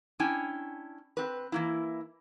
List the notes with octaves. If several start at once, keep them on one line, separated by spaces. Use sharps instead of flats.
C#4 D4 E4 G5 G#5
C4 B4
E3 A#3 E4